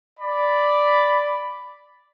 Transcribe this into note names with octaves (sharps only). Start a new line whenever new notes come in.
D5 B5